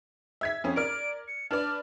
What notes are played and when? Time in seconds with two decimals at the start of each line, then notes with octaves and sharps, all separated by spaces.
0.41 E5 G#6 B6
0.64 F2 C#4
0.76 A#4 D5 F6 D7
1.28 C#7
1.51 D4 B4 D5 F6